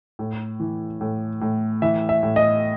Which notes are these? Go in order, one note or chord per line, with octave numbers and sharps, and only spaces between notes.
A2
E3
A2
A2
E3 E5
E5
A2
D#5